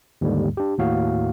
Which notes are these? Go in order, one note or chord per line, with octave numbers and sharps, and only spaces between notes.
D#2 G#2 D3 G3
D4 G4
D#2 A2 F#4 F5